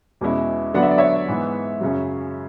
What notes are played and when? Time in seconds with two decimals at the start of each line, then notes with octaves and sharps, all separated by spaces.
0.21 E2 B2 G#3 C#4 E4
0.74 D3 F#3 B3 D4 F#5
0.83 E5
0.91 D5
0.98 C#5 E5
1.28 G#2 E3 B3
1.81 F#2 C#3 F#3